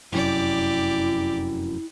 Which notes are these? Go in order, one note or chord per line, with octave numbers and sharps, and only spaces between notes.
F1 F#2 E4 G4 D5